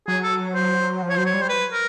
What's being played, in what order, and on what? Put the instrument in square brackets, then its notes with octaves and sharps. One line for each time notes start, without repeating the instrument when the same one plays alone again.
[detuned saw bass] F#3 [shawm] G#4
[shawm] A4
C5
[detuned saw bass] F3
[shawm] C#5
[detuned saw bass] F#3 [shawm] C5
[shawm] C#5
[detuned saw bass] G3
[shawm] C5
B4
A#4